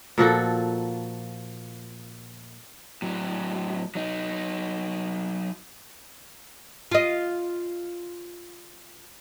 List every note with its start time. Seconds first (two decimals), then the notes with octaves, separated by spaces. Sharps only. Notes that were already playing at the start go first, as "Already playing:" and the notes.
0.18 A#2 F3 F#4 A4
3.02 A2 F#3
3.95 F#3 D#4
6.91 F4 D#5